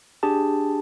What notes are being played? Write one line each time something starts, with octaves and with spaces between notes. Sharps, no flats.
D4 G4 G#4 A5